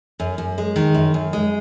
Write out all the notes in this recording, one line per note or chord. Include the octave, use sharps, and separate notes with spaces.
F#2
F#2
G#3
D#3
F#2
F#2
G#3